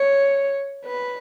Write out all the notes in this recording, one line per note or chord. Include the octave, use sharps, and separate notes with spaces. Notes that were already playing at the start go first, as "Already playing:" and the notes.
Already playing: C#5
B4